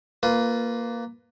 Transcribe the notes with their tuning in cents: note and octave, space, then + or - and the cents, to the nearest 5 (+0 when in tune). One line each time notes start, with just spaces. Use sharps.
A#3 +0 F4 +0 B4 +15